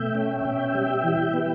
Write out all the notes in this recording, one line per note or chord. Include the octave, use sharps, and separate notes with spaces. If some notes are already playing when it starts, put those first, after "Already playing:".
Already playing: B2 A3 E5 G5
C#4
B2
G3
E3
B3